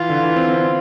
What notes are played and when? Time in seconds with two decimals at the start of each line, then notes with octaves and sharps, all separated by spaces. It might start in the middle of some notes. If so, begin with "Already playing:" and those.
Already playing: E3 F4
0.10 D3
0.23 E3
0.36 C4
0.49 C4
0.61 C4